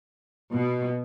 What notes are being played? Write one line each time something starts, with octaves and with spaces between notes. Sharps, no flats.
B2